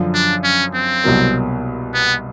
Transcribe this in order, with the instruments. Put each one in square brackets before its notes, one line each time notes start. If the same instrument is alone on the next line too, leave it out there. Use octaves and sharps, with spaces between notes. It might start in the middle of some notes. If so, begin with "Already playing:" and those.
Already playing: [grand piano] F#2 D3 F3
[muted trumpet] D4
C#4
C4
[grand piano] C2 B2 F#3 A#3
[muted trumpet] B3